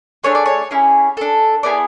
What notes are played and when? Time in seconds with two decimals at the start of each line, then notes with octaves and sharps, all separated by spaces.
0.24 A3 D4 G#4 C#5
0.35 D5
0.46 C#5
0.71 C#4 E4 G#4
1.17 D4 A4
1.63 B3 E4 G#4 D5